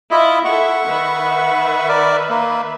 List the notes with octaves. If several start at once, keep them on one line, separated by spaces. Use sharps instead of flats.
E4 F4 D#5 E5
E4 A4 E5 F#5 C#6
D#3 B4 E5
A#4 D5
A#3